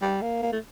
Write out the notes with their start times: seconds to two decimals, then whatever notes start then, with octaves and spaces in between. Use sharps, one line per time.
0.02 G3
0.22 A#3
0.43 A#3
0.52 A3